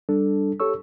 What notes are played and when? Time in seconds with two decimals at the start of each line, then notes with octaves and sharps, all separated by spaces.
0.09 G3 D4 A4
0.60 G4 A4 C#5 C#6 E6